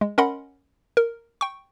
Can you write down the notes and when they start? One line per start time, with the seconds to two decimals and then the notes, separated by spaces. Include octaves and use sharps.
0.01 G#3
0.18 C#4 A#4 D#5 F#5 B5 C6
0.97 A#4
1.41 G5 C#6